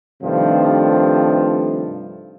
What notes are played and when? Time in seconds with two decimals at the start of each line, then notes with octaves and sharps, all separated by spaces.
0.22 G2 C3 D#3 F3 A3